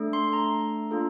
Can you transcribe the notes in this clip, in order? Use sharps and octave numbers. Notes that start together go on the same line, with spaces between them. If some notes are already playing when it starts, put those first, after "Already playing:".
Already playing: A3 D4 A4
C6
A#5
A#3 D4 F4 A4